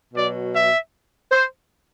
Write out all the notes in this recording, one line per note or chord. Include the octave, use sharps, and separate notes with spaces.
B2 F#3 D5
E5
C5